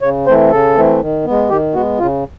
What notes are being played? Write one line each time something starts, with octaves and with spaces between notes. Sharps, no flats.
C#3 C#5
E3 A3 C4 C5
C#3 A4
E3 A3 C4
D#3
B3
G#3
D#3 G4
G#3 B3 F#4
C#3 F4